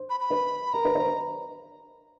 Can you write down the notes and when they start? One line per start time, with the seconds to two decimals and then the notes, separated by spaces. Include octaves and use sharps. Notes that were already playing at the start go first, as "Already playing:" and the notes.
Already playing: C5
0.10 B5
0.20 B5
0.30 B4
0.73 A#4 A#5
0.85 B4
0.95 C5
1.06 B4